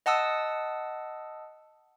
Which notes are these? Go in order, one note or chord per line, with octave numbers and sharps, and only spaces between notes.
D#5 F#5 A5 D#6 E6